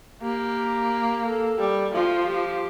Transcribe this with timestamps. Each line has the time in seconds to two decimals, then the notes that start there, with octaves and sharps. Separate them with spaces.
0.21 A#3 G4
1.25 A4
1.59 G3
1.93 F3 F4
2.27 G4